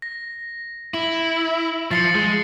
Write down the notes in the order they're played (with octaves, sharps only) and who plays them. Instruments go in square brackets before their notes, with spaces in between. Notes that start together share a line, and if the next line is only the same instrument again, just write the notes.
[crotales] A#6
[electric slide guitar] E4 [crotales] F#7
[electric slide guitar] F3 [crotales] A6 C7 C#7
[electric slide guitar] G#3